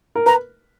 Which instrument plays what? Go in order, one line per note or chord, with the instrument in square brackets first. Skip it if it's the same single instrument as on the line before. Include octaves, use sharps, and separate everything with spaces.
[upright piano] A#4
[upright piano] B4 [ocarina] A#5